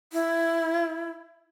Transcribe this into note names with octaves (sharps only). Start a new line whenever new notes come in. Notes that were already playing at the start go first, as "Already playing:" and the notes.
E4